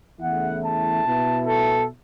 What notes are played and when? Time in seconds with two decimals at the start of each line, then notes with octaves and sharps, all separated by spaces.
0.20 E2 C#3 A3 E4 F#5
0.63 A5
1.04 B2 B3 E4
1.47 A4